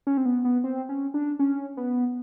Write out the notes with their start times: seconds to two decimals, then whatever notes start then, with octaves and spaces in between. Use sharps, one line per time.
0.07 C#4
0.17 C4
0.26 B3
0.45 B3
0.64 C4
0.89 C#4
1.14 D4
1.39 C#4
1.77 B3